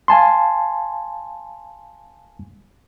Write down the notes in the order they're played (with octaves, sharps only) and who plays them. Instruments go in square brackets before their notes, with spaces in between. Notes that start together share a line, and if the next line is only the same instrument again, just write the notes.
[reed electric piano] F5 G#5 A5 C6